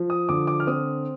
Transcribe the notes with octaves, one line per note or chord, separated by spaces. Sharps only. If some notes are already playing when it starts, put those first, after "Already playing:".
Already playing: F3
D#6
D3 D6
D6
F6
C4 D#6